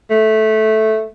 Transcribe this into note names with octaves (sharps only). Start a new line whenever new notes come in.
A3